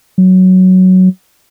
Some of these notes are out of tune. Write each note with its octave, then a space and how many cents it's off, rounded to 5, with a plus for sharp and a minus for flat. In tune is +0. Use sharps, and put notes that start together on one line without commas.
F#3 +5